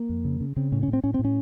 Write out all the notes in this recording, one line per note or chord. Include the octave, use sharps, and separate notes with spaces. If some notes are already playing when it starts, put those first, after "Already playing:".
Already playing: A#3
F2
C#3
C#3
C#3 C4
A2 C#4
C#4
A2
C4
A2 C#4
A2 C4
C#4